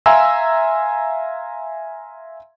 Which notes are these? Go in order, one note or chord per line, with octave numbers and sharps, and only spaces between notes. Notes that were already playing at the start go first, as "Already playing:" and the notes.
E5 F5 G#5 A#5 C6 E6